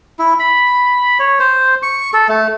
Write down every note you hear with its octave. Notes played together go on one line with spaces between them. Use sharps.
E4
B5
C#5
C5
C#6
A4
A3